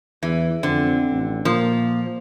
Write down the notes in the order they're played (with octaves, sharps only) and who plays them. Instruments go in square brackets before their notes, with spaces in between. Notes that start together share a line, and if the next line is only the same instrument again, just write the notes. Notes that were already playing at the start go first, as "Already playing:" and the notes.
[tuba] E2 [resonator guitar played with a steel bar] E3
[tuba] F2 [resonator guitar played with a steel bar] D3 [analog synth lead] C4
[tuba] A1
[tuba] A#2 [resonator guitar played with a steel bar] F3 [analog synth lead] A#3